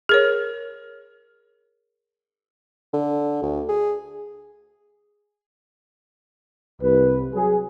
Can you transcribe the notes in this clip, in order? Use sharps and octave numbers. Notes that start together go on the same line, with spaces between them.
G#4 A#4 C#5
D3
D2
G#4
C2 B4
F#3 G#4